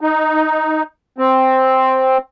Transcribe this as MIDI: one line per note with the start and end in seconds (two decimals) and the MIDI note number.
0.01 0.83 63
1.18 2.18 60